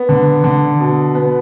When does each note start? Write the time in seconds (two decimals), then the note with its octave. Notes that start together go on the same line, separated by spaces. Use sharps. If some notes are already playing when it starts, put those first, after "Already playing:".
Already playing: B3
0.09 D3
0.44 D3
0.80 B2
1.15 B3